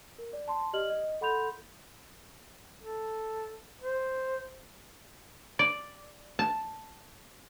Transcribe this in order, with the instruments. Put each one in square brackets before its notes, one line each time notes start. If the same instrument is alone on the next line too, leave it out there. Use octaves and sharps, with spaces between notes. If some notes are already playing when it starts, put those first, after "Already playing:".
[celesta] A#4
D5
A5 C6
G4 D5 D#5 F6 F#7
D#5
A4 F#5 B5 C6 G6 F7
[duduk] A4
C5
[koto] D5
A5